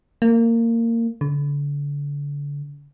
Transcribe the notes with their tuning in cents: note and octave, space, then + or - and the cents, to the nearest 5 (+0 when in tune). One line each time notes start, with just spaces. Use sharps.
A#3 -20
D3 -35